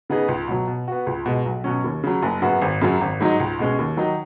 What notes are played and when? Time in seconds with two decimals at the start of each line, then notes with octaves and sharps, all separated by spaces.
0.09 C#3 B3 D#4 G#4
0.28 C#2
0.48 B2 F#3
0.67 B2
0.88 B3 F#4
1.07 C#2
1.26 B2 G#3
1.46 B1
1.64 B2 F#3 C#4
1.84 D#2
2.04 C#3 F#3
2.23 F#1
2.42 F#2 C#3 B3 F#4
2.62 G#1
2.81 F#2 C#3 F#3
3.01 G#1
3.20 G#2 F#3 D#4
3.40 C#2
3.59 B2 G#3 C#4
3.79 D#2
3.97 D#3 F#3 D#4